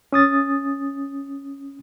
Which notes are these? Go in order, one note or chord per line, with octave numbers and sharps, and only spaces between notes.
C#4 D#6 A6